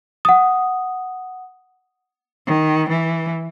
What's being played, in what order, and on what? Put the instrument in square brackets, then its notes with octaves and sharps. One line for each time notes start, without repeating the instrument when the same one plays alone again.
[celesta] F#5 D#6
[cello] D#3
E3